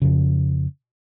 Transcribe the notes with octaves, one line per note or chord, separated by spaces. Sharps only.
F2 C#3